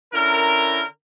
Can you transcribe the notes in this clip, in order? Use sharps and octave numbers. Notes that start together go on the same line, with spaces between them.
D3 C#4 E4 A#4